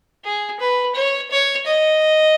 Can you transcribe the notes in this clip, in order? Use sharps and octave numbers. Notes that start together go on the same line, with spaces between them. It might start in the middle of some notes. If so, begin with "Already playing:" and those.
G#4
B4
C#5
C#5
D#5